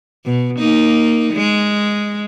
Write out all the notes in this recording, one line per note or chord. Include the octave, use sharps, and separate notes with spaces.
B2
A#3 D#4
G#3